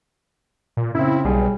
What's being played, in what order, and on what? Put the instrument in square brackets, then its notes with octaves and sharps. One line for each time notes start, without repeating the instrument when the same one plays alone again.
[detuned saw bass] A#2
[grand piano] C#3 C4 [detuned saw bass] E4
[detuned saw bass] B1 [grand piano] G3 G#4